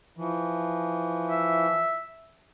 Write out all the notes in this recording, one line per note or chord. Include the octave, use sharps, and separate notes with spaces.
E3 F3
E5